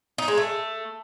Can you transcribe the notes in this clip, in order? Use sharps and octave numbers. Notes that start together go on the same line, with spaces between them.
D#4
G#3
A3